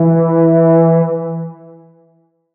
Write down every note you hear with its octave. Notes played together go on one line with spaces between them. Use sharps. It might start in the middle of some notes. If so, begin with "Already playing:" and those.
Already playing: E3